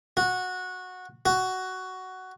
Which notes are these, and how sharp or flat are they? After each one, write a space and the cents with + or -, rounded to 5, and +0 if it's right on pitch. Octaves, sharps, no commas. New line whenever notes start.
F#4 -15
F#4 +10